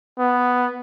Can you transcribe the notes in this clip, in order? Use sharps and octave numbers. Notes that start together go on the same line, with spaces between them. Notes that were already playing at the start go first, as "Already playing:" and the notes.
B3